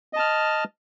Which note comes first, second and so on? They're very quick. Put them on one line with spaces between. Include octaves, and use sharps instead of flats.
D#5 A5 F6